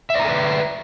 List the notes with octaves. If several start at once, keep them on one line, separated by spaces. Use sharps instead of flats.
A4 B4 D5 E5 A#5